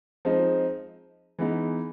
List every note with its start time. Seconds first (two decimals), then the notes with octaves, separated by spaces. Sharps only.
0.25 F3 G#3 C4 D#4
1.39 E3 G#3 B3 D#4